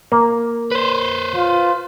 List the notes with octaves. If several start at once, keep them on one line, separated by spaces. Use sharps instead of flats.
A#3
B4 C5
F4